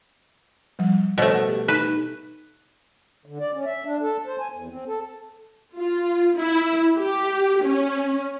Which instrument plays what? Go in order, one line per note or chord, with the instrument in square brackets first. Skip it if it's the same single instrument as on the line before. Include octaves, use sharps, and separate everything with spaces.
[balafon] F3 G3
[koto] B2 A3 [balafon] C5 C#5 F#5
[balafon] F#5
G4
[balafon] D#4 A4 [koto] B4
[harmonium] D3
D5
C#4
E5
D4
A4
C5
G#5
E2
C4
A4
[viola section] F4
E4
G4
C#4